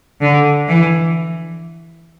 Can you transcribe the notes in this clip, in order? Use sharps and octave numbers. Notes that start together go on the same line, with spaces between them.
D3
E3